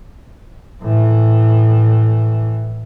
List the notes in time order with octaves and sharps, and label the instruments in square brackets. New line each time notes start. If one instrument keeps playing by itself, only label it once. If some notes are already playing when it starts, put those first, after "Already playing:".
[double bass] A2 E3